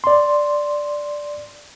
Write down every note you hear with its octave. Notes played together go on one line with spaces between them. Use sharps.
D5 C6